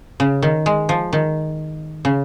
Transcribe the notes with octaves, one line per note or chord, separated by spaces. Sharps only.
C#3
D#3
G#3
F3
D#3
C#3